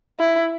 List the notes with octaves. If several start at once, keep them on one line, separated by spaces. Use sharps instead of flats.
E4